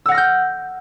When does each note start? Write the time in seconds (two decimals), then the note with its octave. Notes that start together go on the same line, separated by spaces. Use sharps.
0.06 E6
0.09 F#5
0.12 A#6
0.15 F6
0.18 G6